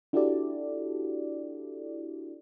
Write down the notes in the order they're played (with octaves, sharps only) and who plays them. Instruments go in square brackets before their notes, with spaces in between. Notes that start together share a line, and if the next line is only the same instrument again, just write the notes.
[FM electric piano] D4 E4 F#4 G4 A4 D5